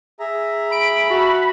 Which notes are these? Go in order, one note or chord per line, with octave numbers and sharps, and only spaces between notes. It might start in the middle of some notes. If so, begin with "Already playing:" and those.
G#4 E5 A#5
B5 D7
F#4 E5 A5 F6